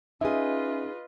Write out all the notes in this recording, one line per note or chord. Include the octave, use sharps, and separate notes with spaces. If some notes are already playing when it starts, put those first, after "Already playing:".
C#4 D#4 F4 G#4 B4 D#5 E5